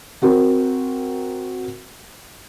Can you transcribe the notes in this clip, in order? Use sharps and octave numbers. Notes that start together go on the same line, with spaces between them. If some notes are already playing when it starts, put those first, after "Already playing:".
C4 F#4 A#4